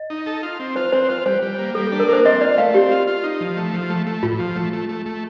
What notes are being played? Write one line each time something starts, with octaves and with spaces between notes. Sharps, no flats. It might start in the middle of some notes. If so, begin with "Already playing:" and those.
Already playing: D#5
D#4
A4
F4
C4
F4 C5
C4 C5
F4 C5
G3 C5
G3
A#3
G3 A4
D4 A4
A#4
A#3 C5
C4 D#5
F4 D5
A3 F5
C4 G4
F4
F4
D#4
F3
A3
F3
A3
A3
A2 F4
F3
A3
A3
A3
A3